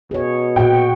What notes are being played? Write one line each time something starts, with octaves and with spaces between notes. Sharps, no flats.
B2 G#4 C#5
A#2 F#4 F#5 G5